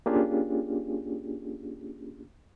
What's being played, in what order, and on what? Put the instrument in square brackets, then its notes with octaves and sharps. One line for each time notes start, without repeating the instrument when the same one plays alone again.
[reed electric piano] A#3 C#4 D4 F4 G4 G#4